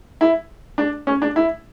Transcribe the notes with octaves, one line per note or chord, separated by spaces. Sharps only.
E4
D4
C#4
D4
E4